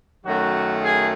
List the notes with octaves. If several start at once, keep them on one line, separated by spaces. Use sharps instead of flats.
F#2 D#3 F#3 A3 F#4
G#4